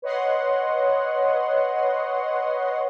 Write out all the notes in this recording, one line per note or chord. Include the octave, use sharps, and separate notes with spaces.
B4 C#5 D#5 F#5 C6